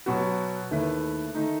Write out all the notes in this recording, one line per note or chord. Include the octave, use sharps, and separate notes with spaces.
B2 F#3 B3 F#4
D#2 D#3 A3 E4 B4
D#3 A3 D#4